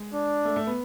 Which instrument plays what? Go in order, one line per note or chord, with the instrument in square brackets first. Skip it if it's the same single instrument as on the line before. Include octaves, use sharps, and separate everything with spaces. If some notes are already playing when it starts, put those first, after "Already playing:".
Already playing: [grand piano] G#3
[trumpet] D4
[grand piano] A3
A3
B3